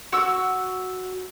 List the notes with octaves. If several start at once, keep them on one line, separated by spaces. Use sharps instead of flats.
F#4 E6